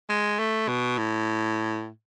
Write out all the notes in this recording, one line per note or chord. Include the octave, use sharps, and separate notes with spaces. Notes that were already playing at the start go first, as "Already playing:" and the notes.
G#3
A3
B2
A2